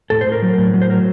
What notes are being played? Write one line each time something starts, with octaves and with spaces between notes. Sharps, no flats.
A2 A4
C5
A2
A#4
F#3
A2
F#3
C5
F#3 A#4